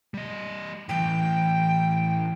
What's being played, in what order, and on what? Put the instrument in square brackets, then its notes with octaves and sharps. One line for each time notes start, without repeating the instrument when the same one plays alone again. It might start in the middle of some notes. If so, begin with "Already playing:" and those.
[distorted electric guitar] G3 D#5
[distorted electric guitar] A2 E3 [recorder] G5